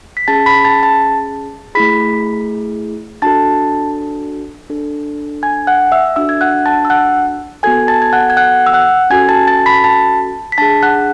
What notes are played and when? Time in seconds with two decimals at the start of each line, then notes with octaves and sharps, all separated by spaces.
0.17 B6
0.28 C#4 G#4 A5 A6
0.46 B5 B6
0.65 A5 A6
0.83 A5 A6
1.75 A3 E4 G#4 B5 B6
3.22 D4 F#4 A4 A5 A6
4.70 D4 A4
5.43 G#5 G#6
5.67 F#5 F#6
5.92 E5 E6
6.16 D4 F#4 A4 E5 E6
6.29 G#6
6.41 F#5 F#6
6.66 A5 A6
6.85 E6
6.90 F#5 F#6
7.63 B3 F#4 A4 G#5 G#6
7.88 A5 A6
8.02 G#6
8.13 F#5 F#6
8.30 G#6
8.37 F#5 F#6
8.66 E6
8.73 F#5 F#6
9.10 C#4 F#4 A4 G#5 G#6
9.29 A5 A6
9.47 A5 A6
9.66 B5 B6
9.84 A5 A6
10.52 B6
10.58 D4 G#4 A5 A6
10.83 F#5 F#6